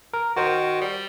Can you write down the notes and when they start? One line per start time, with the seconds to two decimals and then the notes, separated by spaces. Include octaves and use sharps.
0.14 A#4
0.36 D#3 F#4 C5
0.81 G3